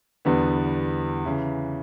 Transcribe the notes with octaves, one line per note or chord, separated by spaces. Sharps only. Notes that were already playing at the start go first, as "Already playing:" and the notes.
E2 D3 G3 B3
C#3 E3